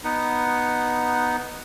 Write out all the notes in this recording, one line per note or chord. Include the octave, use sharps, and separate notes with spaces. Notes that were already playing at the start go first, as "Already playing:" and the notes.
B3 D#4 B4 F#5